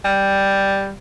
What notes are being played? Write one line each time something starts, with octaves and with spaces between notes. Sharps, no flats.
G3